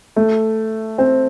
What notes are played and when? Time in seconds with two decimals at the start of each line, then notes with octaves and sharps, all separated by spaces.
0.16 A3
0.98 C4